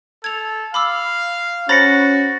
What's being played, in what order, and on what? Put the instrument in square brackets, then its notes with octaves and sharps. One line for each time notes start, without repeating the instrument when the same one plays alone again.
[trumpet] A4 [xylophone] G#6 F7
[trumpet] F5 [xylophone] B5 D6 E6
[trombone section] C#4 [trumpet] F#4 [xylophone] C5 A#5 B5 [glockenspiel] A6 A#6 C#7